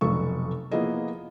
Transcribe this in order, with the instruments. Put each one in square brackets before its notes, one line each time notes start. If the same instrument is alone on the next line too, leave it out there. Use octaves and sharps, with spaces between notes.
[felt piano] F1 B1 A4 C#6
F3 A#3 B3 E4 G#4 D#5